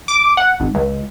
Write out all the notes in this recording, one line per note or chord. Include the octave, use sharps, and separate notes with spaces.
D6
F#5
G#1
C#2